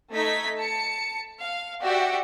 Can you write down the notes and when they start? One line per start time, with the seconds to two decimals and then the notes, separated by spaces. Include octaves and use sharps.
0.12 A3 D#4 G#6 B6
0.58 A5 C#7
1.42 F5
1.81 F#4 G4 D5 E5 F#5 G5